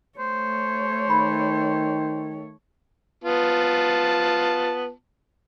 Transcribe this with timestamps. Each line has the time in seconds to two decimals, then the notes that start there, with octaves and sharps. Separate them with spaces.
0.19 A3 C5 C#5
1.10 D#3 B5
3.24 B3 F4 A5